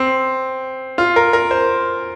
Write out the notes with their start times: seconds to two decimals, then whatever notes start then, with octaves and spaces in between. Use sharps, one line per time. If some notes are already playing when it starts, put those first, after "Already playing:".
Already playing: C4
0.98 F4
1.16 A#4
1.33 A#4
1.51 C5